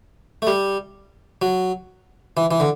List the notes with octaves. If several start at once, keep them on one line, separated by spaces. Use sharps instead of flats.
A3
G3
F#3
E3
E3
D3